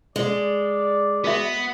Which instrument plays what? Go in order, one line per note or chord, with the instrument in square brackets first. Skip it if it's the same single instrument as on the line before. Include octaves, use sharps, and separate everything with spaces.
[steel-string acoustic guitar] G#3 [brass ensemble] D5
[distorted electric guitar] B3 [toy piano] F#4 E5